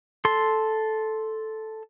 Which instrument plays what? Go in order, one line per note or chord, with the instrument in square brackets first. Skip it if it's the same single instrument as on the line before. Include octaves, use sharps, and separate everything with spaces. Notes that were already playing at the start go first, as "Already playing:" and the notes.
[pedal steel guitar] A4 C6